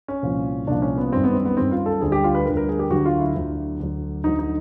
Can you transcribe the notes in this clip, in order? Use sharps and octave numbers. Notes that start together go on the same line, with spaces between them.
C#4
C2 A#2 F3
C2 A#2 F3 D4
C#4
B3
F#2 D#3 G3 C4
B3
C4
B3
F#2 D#3 G3 C4
F4
A4
D2 D3 G3 G#4
G4
F4
B4
D2 D3 G3 A#4
A#4
G#4
G4
D2 D3 F#3 F#4
F4
E4
D2 D3 F#3
D2 D3 F#3
D2 D3 F#3 D#4
D#4